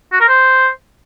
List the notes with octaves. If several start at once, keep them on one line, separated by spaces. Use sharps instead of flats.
F#4
A#4
C5